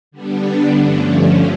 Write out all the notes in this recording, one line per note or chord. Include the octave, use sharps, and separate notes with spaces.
D3 G3 B3 D4
G2 D3 F3 A3 C#4